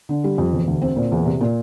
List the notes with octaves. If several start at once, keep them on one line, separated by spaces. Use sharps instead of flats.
D3
G3
F2
E1
D2
C4
A#2
E2
C3
A#2